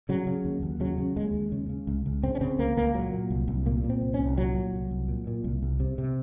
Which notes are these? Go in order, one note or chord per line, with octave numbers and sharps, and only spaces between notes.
C#3 F#3
C#3
D#2
D#2
C#3 F#3
C#3
D#2 G#3
D#2
C#3
C#3
C#2
C#2
C#3 C4
C#4
C#3 C4
C#2 A#3
C#2 A#3
A#2 F#3
A#2
C2
C2
A#2 A#3
A#2
C4
C2
C#4
C2
A#2 F#3
A#2
C2
C2
A#2
A#2
C2
C2
C3
C3